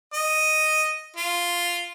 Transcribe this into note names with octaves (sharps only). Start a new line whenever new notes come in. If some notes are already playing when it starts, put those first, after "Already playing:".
D#5
F4